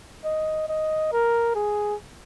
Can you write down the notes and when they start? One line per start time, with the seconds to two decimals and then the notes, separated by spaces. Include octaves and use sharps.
0.25 D#5
0.69 D#5
1.12 A#4
1.55 G#4